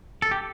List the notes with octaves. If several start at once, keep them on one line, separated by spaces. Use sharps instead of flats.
A4
G4